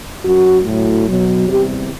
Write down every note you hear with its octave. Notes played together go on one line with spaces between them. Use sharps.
F#2 F#3 F#4
A2 F#3
B2 F#3
E2 C3 G3 G4